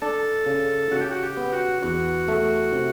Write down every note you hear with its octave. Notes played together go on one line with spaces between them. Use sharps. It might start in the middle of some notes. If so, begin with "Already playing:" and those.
D4 A4
C#3
C#3 F#4
G4
F#4
G4
B3
F#4
E2 F#4
A3
C3